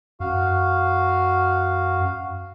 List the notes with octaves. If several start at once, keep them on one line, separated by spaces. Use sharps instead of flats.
F#2 F#4 F5